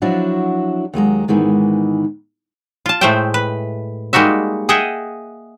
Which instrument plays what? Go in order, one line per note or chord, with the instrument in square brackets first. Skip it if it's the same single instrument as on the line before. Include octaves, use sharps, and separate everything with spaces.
[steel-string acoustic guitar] F3 F#3 D4 E4 F#4
D#2 F#3 G#3 A#5
G#2 D#3 E3 G#3 B3
[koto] F4 A5
A2 G#3 A3 C5 E5 G5
B4
G3 G#3 A#3 D#4 F#4 E5
G#4 D#5 E5 F#5 G5